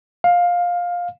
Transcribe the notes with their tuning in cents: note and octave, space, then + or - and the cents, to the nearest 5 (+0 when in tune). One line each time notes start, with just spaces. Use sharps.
F5 +15